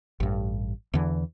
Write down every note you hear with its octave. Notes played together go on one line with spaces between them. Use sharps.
A1 G2
E2 D3 E3